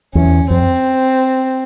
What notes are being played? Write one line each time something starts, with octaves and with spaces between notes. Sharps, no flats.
E2 C#4
F2 C4